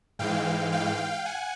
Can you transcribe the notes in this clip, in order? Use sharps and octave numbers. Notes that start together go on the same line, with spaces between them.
G#2 E3 G#3 F5 G5
F5 G5
F#5 G#5